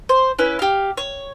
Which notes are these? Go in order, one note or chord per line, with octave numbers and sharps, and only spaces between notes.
C5
C#4 E4 B4
G4 F5
C#5